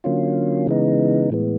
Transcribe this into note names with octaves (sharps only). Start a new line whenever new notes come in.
D3 F#3 A#3 C#4 F4
C#3 E3 G#3 B3 D#4
A2 E3 G#3 B3